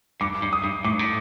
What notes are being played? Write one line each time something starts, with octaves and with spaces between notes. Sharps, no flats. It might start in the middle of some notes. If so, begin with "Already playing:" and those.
G2 D6
G2
D#6
G2
A2 D6
G2
A2